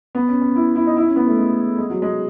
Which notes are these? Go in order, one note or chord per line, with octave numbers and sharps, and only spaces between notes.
B3
C#4
C#4
E4
E4
D#4
E4
C#4
B3
A3
G#3
G#3
F#3
G#3